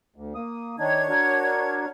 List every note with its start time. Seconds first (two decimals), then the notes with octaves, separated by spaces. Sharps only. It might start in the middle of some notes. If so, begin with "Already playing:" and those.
0.16 D2
0.35 A#3 D#6
0.79 D#3 D4 D#4 C#5 G#6
1.09 D4 F#4 A#4